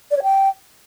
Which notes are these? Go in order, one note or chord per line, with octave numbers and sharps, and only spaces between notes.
D5
C#5
G5